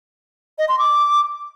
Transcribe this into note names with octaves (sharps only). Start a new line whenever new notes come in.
D#5
C6
D6